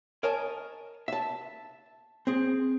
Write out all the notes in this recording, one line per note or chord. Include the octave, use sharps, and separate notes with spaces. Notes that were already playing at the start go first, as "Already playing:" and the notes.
A#4 C#5 D#5 G#5 A5
E5 A5
C4 G#4